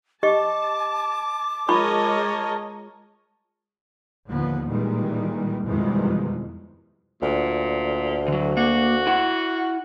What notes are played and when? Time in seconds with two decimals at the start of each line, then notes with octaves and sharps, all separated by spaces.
0.23 G4 D#5 A5 C#6 D6
1.69 G#3 F4 A#4 C#5 D#5 A5 B5 C#6
4.29 D#2 D3 F3 B3
4.68 A#2 D#3 E3 G3 G#3
5.64 F2 B2 D#3 E3 G3 G#3
7.22 D2 A#2
8.28 D3 F#3
8.57 A#3 F#4
9.07 E4 F#5